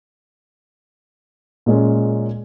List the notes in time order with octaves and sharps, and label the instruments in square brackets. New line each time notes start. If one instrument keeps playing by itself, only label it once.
[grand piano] A#2 G#3 C#4